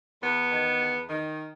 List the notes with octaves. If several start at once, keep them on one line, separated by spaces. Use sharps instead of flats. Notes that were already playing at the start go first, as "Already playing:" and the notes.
E2 B3
D#3
E2
D#3